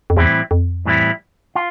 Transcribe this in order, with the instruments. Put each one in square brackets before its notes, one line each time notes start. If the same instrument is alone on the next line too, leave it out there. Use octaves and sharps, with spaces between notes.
[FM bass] F2
[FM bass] E2 [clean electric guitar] A2 E3 G3 C4 E4
[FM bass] F2
[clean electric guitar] A2 E3 G3 C4 E4
F4